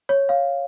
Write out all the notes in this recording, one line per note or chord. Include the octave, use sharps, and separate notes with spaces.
C#5
F5